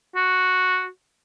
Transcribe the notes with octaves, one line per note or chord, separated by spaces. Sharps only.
F#4